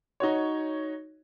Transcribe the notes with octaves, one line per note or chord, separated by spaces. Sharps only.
D#4 F#4 C#5